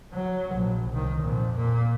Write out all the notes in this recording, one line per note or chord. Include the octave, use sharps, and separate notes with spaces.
F#3
A#1
C2 D#3
F2 A#2
A#2 A#3